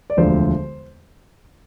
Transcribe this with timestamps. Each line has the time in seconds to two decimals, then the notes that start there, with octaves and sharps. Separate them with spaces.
0.10 D5
0.17 E1 D2 D3 F3 C5